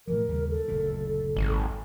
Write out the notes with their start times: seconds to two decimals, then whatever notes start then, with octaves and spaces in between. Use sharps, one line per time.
0.08 A2 E3 F3 A#4
0.28 D#2 C#3 G3
0.50 A4
0.68 F#1 D2 A#2
1.36 G#1